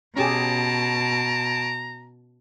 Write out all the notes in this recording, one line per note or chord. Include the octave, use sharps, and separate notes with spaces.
B2 C#4 G4 G#4 A5 A#5 D7